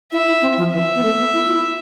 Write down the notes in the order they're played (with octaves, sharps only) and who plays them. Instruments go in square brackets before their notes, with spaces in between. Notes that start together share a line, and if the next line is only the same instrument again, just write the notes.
[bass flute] E4 [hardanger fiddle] E5
[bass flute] E4
C4
F3
[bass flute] E3 [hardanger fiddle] E5
[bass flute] B3
A3
B3
E4
F4
E4